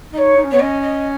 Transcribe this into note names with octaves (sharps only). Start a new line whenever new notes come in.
D#4 C#5 D#5
D#4
C#4
B3 C#5
C#4 D#5
D#5